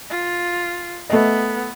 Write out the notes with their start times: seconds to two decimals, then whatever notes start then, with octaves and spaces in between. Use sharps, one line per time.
0.10 F4
1.10 A3 B3 D#5